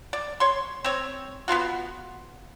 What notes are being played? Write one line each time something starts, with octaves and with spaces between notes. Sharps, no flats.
D5
C#5 C6
C4 C#5
B3 C4 F4 F#4